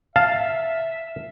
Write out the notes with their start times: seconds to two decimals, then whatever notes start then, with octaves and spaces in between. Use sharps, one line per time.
0.16 E5 F5 A5